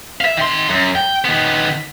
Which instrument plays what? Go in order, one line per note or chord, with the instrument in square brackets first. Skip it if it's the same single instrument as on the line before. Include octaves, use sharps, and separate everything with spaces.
[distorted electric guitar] E5 F5
D#3 C6
F#2
G5
D#3 B3